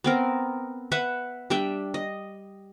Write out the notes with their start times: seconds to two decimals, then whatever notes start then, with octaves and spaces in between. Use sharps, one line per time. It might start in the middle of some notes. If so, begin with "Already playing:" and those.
0.04 B3 C4 A#4
0.92 B4 E5 F#5 B5
1.50 G3 D4 E5 G5
1.94 D#5